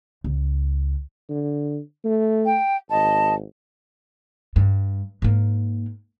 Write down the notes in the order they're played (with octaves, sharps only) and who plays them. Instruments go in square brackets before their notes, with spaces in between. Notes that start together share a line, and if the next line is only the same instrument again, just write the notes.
[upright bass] C#2
[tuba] D3
A3
[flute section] G5
[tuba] G#1 [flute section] D#5 A5
[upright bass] G2
G#2 A#3